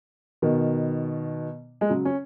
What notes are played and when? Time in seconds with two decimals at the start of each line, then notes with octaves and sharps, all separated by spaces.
0.42 B2 D#3
1.81 G#3
1.89 C#3 F#3
2.05 C#4